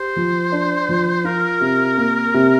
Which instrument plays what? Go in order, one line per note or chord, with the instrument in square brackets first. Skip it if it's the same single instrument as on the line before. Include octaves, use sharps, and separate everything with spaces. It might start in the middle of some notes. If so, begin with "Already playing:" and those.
Already playing: [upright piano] G4 [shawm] C5
[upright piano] F3
D4
F3
[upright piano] F4 [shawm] A#4
[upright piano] C3
A#3
C3